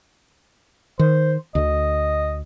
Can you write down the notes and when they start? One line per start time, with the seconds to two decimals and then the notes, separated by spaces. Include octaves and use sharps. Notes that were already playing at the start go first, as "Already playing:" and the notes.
0.99 D#3 C5
1.55 D2 D3 D#5